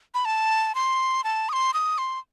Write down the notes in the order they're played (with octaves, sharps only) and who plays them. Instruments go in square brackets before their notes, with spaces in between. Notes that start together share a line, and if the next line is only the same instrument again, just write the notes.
[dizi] B5
A5
C6
A5
D#6
C6
D#6
C6